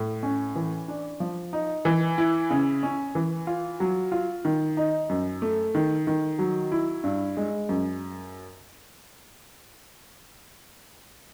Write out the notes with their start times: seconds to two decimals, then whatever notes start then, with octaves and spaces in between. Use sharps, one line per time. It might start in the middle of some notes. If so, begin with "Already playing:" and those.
Already playing: A2
0.23 C#4
0.56 E3
0.88 D4
1.20 F3
1.53 D#4
1.85 E3
2.18 E4
2.50 C#3
2.83 C#4
3.15 E3
3.47 F4
3.80 F#3
4.12 F4
4.45 D#3
4.77 D#4
5.09 F#2
5.42 A3
5.75 D#3
6.07 D#3
6.39 F#3
6.72 E4
7.04 G2
7.37 G#3
7.69 F#2